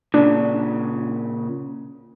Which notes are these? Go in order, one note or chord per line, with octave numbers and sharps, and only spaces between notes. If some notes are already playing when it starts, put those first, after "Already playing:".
A#2 C#3 D4